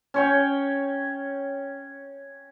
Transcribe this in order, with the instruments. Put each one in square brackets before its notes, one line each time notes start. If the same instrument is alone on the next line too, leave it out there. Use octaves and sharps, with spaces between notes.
[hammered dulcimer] C#4 C#5 G5